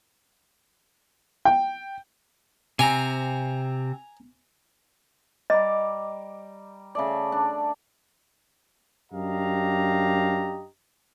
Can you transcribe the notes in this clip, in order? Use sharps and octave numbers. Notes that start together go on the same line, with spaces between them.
G5
C3 C4 G#5 A#5
G3 D#5 A#5 D6
C#3 A3 D5
D4
F#2 D4 G4 D#5 F5 A#5